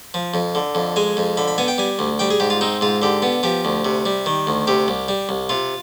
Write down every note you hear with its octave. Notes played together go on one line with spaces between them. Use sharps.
F3
F2
D3
F2
G#3 G#5
F2
D3 B5
B5
B3 G#5
G5
G3 G#5
D2
G3 G5
G#4
G#2 G4
F4
C4 D#4
G#2 F4
D3 G4
B3
F3 G4
D2
C3
G3
D#3
D2
C3 G4
C2
G3
C2
C3 F4